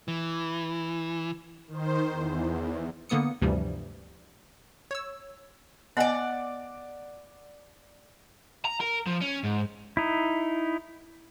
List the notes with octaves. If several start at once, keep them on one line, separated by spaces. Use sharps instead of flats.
E3
D#3 C5
E2
D3 A#3 B3 D#6 C#7
D2 G2 C3 E3 F3 G3
C#5 E6
B3 D5 D#5 F#5 G#5
A#5
A#4
F3
C#4
G#2
D#4 E4